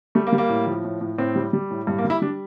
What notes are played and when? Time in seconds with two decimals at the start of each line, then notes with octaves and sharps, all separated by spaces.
0.15 G3 A3
0.27 A#3
0.33 G3
0.38 A#3
0.49 A2
0.67 F3
0.84 A2
1.01 A2
1.18 A2 C4
1.36 G3
1.53 G3
1.71 A2
1.87 G2
1.98 A#3
2.05 G3
2.10 E4
2.22 G3 D4